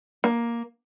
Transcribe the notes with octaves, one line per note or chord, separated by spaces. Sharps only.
A#3